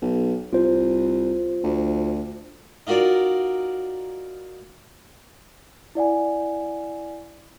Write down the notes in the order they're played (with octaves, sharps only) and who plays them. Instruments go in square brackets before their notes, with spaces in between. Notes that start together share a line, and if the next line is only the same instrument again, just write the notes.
[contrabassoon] B1
[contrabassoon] C2 [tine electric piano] F4 C5
[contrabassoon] D2
[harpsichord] D#4 F4 F#4 A#4 D5
[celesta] E4 D5 F#5 G#5